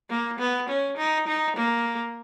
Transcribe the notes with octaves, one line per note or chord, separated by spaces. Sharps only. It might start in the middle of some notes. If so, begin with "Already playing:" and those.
A#3
B3
C#4
D#4
D#4
A#3